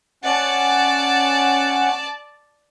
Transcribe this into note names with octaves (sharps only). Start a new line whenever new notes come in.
C#4 D5 F#5 A5